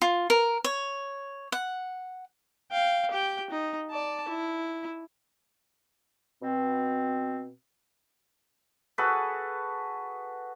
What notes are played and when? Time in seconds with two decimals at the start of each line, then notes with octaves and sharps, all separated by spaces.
0.02 F4
0.30 A#4
0.64 C#5
1.52 F#5
2.72 F5 G5
3.11 G4 G5
3.50 D#4
3.91 D5 A5
4.28 E4
6.42 B2 C4
8.98 F#4 G#4 A4 B4